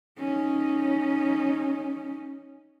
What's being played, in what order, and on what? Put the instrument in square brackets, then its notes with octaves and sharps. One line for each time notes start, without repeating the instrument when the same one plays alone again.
[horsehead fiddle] C#4 D#4